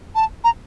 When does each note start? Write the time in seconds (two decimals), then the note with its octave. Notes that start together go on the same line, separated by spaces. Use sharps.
0.15 A5
0.44 A#5